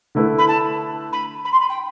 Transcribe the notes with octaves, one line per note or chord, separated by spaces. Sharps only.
D3 A3 E4 B4
B5
A5
B5
B5
C6
B5
G5